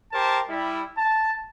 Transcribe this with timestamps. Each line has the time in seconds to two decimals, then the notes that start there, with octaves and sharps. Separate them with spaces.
0.13 G4 A#4 C5 A5
0.49 G3 E4
0.97 A5